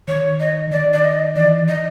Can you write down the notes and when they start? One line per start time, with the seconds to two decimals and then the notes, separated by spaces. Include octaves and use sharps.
0.08 D#3 C#5
0.40 D#5
0.71 D#3 D5
0.93 D5
1.04 D#5
1.36 E3 D5
1.68 D#5